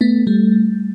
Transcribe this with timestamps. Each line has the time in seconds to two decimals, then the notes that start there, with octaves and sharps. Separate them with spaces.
0.01 A3 B3
0.27 G3 A3